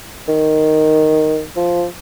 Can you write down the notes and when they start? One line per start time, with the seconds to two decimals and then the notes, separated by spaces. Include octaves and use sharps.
0.28 D#3
1.57 F3